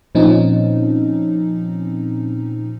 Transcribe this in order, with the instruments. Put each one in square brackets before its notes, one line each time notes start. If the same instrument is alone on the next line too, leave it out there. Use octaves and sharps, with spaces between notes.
[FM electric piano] A#2 F3 C4 C#4 D#4